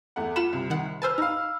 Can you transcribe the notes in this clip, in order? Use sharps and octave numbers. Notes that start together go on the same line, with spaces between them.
E2 A3 F#5
F4 F#5 B5 E7
C2
D#3 F#5
B4 C5 G#5 A5 E6 F6
D#4 F5 B5 E6